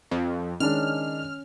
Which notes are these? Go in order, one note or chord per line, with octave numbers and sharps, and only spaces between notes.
F2
D#3 G#3 C#4 D4 F6